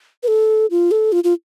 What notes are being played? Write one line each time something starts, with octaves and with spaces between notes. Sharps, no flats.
B4
A4
F4
A4
F4
F4